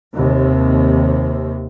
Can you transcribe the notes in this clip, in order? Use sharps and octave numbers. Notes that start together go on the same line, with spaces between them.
D#2 C3